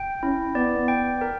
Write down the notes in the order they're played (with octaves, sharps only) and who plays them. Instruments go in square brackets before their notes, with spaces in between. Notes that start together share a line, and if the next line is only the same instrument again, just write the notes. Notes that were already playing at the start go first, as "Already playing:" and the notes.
Already playing: [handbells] G5
[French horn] C#4 [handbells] E4
[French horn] B3 [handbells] D5
[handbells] G5
A#4